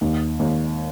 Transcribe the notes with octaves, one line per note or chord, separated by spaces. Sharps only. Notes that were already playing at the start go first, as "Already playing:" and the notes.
D#2
D#2